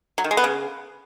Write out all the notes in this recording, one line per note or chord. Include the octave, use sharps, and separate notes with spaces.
F#3
D#3
G#3
B3
C#3